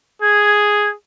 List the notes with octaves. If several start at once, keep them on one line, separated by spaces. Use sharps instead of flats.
G#4 G#6